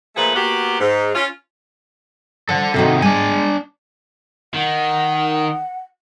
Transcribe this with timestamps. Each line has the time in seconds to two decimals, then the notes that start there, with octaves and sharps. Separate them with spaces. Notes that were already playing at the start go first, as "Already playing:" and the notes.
0.16 A#2 F3 A3 G#4 B4
0.35 A#3 B3 F#4 G4
0.80 G#2
1.15 C#4 F4
2.49 F3 A4 F#5
2.74 C3 D#3 D#4 F#4 A4
3.02 G#3 D4 G#5
4.54 D#3 F#5